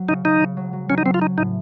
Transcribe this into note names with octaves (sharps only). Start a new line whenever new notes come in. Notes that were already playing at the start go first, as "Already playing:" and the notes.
Already playing: F#3
C#3 D#4
C#3 D#4
C#3
F#3
F#3
F#3 C#4
D#4
F#3 C4
F4
C#4 D#4
A2 D#4